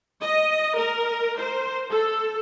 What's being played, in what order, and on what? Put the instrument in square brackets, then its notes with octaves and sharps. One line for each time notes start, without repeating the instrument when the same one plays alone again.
[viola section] D#5
A#4
C5
A4